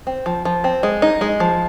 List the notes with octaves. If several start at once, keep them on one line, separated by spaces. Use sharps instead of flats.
C4
F3
F3
C4
G#3
D#4
G#3
F3